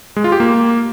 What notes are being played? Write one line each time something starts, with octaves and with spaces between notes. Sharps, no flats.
G#3
F4
G4
A#3